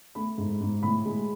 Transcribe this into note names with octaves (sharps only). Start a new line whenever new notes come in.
A3 B5
G#2
G#2
A2 B5
G#3